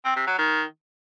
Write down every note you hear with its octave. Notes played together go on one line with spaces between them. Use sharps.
C4
C3
F#3
D#3